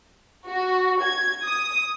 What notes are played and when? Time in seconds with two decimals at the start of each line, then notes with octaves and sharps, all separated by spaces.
0.47 F#4
1.02 G#6
1.44 D#6